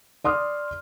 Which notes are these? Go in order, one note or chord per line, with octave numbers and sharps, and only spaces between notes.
D5 C6 D#6 F6